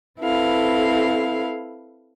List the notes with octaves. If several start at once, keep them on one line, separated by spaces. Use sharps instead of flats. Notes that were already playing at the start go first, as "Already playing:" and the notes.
C4 E4 A4 B4 F5